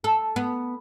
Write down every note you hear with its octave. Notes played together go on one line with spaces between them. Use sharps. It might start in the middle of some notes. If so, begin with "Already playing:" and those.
A4
B3